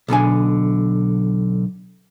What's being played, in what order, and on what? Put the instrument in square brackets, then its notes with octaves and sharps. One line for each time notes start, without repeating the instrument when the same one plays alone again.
[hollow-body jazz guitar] B1 B2 D3 G#5